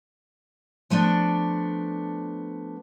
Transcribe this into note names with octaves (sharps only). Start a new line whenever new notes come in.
F3 A3 B3 D4